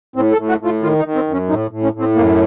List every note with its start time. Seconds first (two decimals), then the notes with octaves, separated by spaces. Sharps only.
0.16 A2 C4
0.32 A4
0.37 A2
0.49 F#4
0.60 A2
0.65 F4
0.83 D#3 F4
0.99 D#4
1.05 D#3
1.15 C4
1.27 F#2
1.33 C#4
1.49 A2 D#4
1.71 A2
1.83 C#4
1.94 A2
2.00 C4
2.16 F#2 A#3